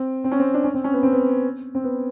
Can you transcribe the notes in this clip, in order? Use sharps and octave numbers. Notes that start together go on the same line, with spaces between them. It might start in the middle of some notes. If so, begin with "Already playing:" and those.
Already playing: C4
C4
C#4
C4
D4
C#4
C4
C#4
B3
C4
B3
C4
B3